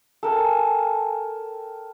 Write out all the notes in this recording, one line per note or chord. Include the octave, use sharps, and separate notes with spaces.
A4 A#4 G5 G#5